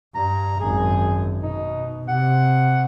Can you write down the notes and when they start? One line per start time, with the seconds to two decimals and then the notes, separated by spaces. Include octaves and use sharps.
0.15 G2 A#5
0.60 G#1 F#2 G#4
1.42 B2 D#4
2.08 C3 F#5